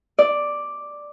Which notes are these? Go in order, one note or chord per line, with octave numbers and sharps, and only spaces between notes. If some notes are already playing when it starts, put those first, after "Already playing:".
D5